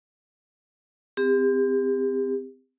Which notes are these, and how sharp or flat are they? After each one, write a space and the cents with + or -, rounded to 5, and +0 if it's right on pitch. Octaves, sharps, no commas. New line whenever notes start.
C4 -25 G4 +35